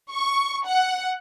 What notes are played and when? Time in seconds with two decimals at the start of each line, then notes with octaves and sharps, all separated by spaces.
0.11 C#6
0.66 F#5